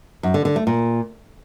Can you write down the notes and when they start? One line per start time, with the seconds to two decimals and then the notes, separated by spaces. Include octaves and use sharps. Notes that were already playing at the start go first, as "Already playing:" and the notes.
0.23 F#2
0.34 D3
0.45 D3
0.56 A3
0.67 A#2